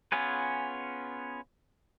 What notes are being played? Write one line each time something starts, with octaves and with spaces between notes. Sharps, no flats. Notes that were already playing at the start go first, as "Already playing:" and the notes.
B3 C#4 F4 G#4 B4